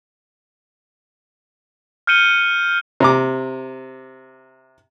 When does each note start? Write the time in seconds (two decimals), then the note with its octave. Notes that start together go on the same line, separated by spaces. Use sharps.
2.07 F6 G6 C#7 D#7 G7
3.00 C3 A#5 D6